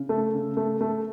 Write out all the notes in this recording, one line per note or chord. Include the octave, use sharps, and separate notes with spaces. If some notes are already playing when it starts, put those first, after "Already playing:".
Already playing: C#3
A3
C#3
A3
A3